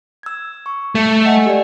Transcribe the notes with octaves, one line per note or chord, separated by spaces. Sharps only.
E6 G#6
C#6
A3
D#5 F#5 G#5
G4 D5